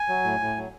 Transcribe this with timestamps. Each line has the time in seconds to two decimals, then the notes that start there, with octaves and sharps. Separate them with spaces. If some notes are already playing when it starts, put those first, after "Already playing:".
Already playing: G#5
0.09 F#3
0.24 A2
0.40 A2
0.56 F#3